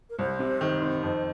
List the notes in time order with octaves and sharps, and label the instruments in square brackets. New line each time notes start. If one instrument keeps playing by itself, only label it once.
[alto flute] A#4
[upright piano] C2 [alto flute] C5
[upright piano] C3
D#3
C4
[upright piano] F2 [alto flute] C5